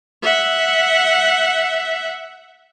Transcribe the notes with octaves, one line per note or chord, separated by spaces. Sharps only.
E5 F#5